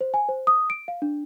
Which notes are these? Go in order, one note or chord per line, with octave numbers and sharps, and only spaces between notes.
C5
G#5
C5
D#6
D7
F5
D4